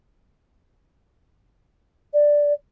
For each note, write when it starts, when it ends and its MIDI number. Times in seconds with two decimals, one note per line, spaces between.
2.13 2.53 74